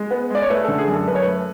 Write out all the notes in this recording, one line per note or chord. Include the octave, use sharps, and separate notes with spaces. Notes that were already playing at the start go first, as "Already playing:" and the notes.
Already playing: G#3
B3
G#3 D5
C#5
A3 B4
D3 A4
G#4
F#2 A4
F#2 B4
C#5
A3 B4